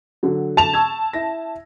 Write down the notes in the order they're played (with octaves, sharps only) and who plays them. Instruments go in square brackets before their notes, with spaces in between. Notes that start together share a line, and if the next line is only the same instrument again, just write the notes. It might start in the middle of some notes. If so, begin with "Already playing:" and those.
[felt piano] D3 F#3
[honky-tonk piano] A5 F7
[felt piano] C#6 E6 G#6
E4 A#6